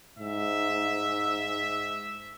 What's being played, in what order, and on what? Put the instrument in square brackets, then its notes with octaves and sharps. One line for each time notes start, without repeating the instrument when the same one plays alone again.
[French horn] G#2 [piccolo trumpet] E5